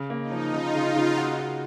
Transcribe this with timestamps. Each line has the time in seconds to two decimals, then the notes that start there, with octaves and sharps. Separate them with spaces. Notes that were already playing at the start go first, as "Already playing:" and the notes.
Already playing: C#3
0.10 A#3
0.21 D#4
0.32 F3
0.53 C#3 F4
0.75 C#3
0.85 D#4
0.96 C#3
1.17 A#3 F#4
1.39 F#4